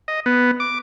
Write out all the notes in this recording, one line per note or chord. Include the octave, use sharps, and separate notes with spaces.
D#5
B3
D6